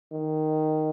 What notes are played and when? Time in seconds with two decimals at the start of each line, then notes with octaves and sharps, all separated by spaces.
0.12 D#3